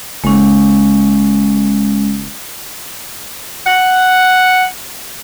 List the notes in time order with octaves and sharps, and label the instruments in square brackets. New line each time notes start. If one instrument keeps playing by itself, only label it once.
[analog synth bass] F#1 [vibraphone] G#3 C#4
[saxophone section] F#5